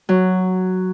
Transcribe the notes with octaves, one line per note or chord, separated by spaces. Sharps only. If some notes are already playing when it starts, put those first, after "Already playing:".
F#3